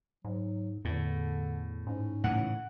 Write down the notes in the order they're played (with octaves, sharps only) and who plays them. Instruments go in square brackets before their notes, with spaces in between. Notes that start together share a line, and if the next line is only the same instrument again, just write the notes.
[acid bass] G#2 [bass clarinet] F#3
[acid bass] E2 [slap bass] A2 [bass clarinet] D3
[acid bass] G#2 [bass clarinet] C#4
[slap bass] A2 C#3 E3 [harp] F#5